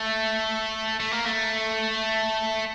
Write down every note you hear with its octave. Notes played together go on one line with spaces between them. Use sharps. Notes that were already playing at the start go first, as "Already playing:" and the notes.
Already playing: A3
A3
A#3
A3